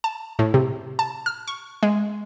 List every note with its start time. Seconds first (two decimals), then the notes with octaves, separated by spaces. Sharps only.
0.04 A5
0.39 A2
0.54 C3
0.99 A5
1.26 F6
1.48 C#6
1.83 G#3